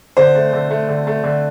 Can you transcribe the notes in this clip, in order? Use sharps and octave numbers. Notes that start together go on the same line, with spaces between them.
D3 C5
A3
D3
A3
D3
A3
D3